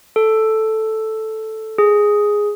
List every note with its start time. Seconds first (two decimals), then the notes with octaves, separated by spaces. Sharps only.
0.16 A4
1.78 G#4